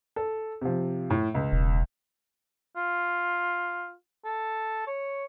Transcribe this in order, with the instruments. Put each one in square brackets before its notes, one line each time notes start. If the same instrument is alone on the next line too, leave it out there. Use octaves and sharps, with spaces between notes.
[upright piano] A4
C3 F3
A2
C#2
[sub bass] E1
[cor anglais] F4
A4
C#5